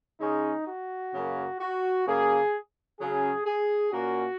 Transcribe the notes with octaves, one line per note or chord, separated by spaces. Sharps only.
C#3 G#3 C#4 D#4
F#4
F#2 C#3 A#3 C#4
F#4
F#2 C#3 A#3 G#4
C#3 F#3 C#4 G#4
G#4
A#2 A#3 C#4 F#4